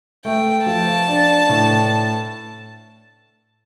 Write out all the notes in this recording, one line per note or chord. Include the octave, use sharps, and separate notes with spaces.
A3 G5
F3 A5
D4
A2